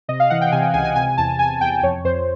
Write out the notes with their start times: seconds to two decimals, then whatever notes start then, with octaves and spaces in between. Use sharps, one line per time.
0.08 C3 D#5
0.20 F5
0.30 E3 F#5
0.41 G5
0.52 C3 G#5
0.74 C#2 G#5
0.85 G#5
0.96 C3 G#5
1.18 E2 A5
1.39 E2 G#5
1.61 E2 G5
1.82 F2 C#5
2.04 F2 C5